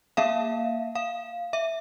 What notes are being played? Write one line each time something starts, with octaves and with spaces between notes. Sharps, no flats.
A#3 E5 F5
F5
E5